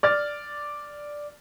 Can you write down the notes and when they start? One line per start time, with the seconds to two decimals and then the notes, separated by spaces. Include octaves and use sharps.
0.03 D5 F6 A6